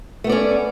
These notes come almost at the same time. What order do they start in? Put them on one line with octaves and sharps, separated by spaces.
A3 B3 D5 C#4